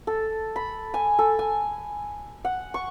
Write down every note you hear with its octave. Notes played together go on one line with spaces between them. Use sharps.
A4
B5
G#5
A4
G#5
F#5
C#6